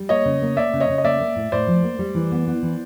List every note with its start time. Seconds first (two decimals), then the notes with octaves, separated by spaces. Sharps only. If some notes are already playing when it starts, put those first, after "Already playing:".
Already playing: G3
0.09 A#3 C#5 D#5
0.25 C#3
0.42 A#3
0.57 A#3 D5 E5
0.73 C#3
0.80 C#5 D#5
0.89 C#3
0.98 D#5
1.04 A#3 D5 E5
1.20 A#3
1.36 A2
1.52 A2 C5 D5
1.67 F3
1.83 A#3
1.99 G3
2.15 E3
2.32 B3
2.47 B3
2.62 E3